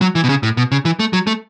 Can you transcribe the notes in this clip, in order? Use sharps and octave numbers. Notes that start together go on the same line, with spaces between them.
F#3
E3
B2
C#3
A2
B2
C#3
E3
A3
F#3
A3